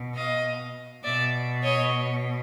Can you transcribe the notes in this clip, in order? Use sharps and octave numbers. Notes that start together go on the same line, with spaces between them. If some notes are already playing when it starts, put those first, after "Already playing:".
Already playing: B2
D#5 F5
B2 D5 E5
C#5 D#5